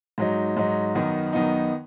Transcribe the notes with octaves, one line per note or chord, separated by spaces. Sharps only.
G#2 F#3 D#4
G#2 F#3 D#4
F#2 D#3 B3 D#4
F#2 D#3 B3 D#4